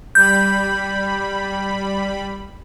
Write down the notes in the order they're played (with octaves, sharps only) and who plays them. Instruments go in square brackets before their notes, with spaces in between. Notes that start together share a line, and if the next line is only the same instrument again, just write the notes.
[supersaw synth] G3 B5 [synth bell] G6